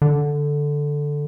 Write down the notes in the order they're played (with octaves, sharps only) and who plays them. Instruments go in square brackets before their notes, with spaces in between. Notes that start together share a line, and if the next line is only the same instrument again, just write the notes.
[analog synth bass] D3